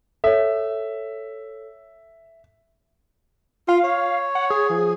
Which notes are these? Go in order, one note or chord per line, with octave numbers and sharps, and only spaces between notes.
A4 C#5 E5
F4 F5
C#5
F#5
G#4
F3